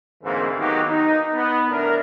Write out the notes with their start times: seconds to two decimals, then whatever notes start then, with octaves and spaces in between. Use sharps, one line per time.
0.24 D2 G#2 E3 G#3 A#3 C4
0.58 D#3 F#3 A#3 B3 D#4 G4
0.88 D#4
1.33 B3
1.70 A2 D3 D4 E4 A#4